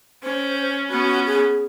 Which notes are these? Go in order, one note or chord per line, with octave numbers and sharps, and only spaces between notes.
C#4 C5
B3 C#4 F#4
G#4